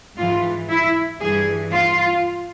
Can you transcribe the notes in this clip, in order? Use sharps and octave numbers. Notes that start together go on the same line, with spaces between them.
G#2 E3 F4
E4
G2 E3 G#4
F4